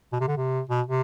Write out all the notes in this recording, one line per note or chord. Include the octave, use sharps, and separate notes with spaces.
B2
C3
D3
C3
B2
C3